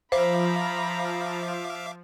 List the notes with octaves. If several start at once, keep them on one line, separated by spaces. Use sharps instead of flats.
F3 C5 E5 F5 A#5 B5 D6